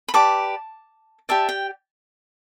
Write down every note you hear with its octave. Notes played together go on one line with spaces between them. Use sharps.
B5
G4 B4 D5 A5 D6
G4 D5 E5 A5
G5